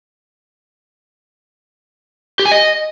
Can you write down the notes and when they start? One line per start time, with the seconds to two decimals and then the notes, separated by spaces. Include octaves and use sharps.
2.39 G4
2.46 G#5
2.52 D#5